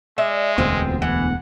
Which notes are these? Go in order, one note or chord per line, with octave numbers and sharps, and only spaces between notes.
G#3 D5 E5
E1 D2 B3 C4 F4
E3 F#5